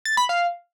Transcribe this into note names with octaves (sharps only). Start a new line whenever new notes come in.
A6
B5
F5